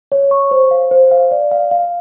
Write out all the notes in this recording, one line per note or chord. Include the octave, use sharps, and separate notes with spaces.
C#5
C#6
C5
F5
C5
F5
D5
F5
F5